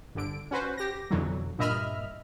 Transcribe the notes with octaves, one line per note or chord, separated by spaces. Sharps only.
G1 D3 D7
C#4 F#4 B4 C5
G4 A#6
F2 B2 D3 E3 F#3
G2 A#2 D#5 E5 B5 F6